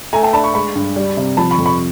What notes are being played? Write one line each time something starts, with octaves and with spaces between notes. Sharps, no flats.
A3 G#5 A#5
G5 A5
D4 A5 B5
B5 C#6
G#3 B5 C#6
G2
G3
C3
F3 A5 B5
B5 C#6
F2
B5 C#6